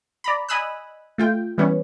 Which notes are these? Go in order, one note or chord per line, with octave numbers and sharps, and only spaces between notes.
D5 A#5 B5
D#5 G#5 B5 D#6 E6 F#6
A3 F4 G5
E3 G3 B3 C#4